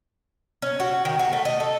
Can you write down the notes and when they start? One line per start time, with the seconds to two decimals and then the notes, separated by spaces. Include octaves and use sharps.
0.62 C#4
0.80 F#4
1.05 D#3
1.19 F#4
1.33 A3
1.45 D#5
1.60 A4